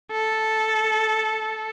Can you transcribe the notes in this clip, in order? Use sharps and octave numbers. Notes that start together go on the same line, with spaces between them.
A4